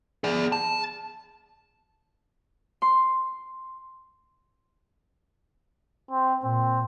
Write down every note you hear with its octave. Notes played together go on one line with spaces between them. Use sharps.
G#4 D5
A5
C6
C4
A#2 C4